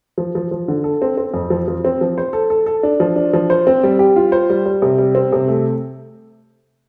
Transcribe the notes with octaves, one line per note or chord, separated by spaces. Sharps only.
F3
F3
F3
D3
A4
C4
C4
F2
F3
F3
C4
F3
C5
A4
A4
A4
D4
F3
D4
F3
C5
C4
G3
G4
F4
C5
G3
G3
C3
G3
C4
C3
A3